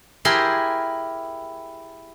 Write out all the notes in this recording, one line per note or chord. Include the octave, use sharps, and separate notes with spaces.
E4 G4 G#4 A#4 C6